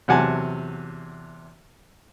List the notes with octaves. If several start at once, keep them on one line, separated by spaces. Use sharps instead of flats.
E2 C3 F#3 F#5 G#5 A5